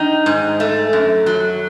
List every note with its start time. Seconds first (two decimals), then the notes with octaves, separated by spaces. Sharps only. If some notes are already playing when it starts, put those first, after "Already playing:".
Already playing: D#3 D#4
0.26 G#2
0.60 A3
0.93 F#2
1.26 F#3